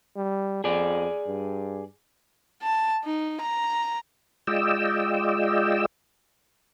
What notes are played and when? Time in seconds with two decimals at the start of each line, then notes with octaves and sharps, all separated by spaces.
0.16 G3
0.64 F2 G#4 D5
1.27 G2
2.63 A5
3.04 D#4
3.41 A#5
4.47 G#3 F4 D5 D#5 G5 E6